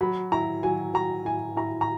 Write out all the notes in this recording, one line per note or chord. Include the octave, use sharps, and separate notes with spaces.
F#3 B5
E4 A#5
F#3 G#5
F#3 A#5
E4 G#5
E4 A#5
A#5